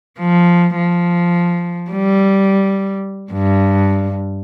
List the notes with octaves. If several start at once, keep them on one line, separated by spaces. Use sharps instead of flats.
F3
F3
G3
G2